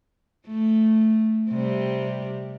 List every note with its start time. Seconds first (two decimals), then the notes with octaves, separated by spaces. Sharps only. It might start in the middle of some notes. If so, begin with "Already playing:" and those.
0.47 A3
1.50 C3 G3